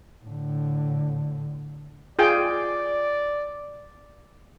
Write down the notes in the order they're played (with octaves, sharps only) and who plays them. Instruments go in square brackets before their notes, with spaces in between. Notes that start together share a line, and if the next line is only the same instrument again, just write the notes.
[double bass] A2 D3
[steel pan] F4 G#4 G5 [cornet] D5